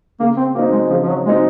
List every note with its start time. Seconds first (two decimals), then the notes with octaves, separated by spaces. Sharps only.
0.20 C#3 A#3
0.37 C4
0.55 F#3 A#3 C4 D#4
0.72 G#3
0.90 C#3 F3
1.03 F3
1.08 F#3
1.26 F#3 G#3 C4 D#4